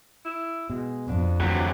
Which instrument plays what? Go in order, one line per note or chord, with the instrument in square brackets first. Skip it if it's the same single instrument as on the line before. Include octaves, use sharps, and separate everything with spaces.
[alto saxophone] E4
[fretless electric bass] B2 [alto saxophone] G#3
[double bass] F2 [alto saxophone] D4
[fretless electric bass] D2 E3 [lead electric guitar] C3 F#3 [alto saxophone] F#4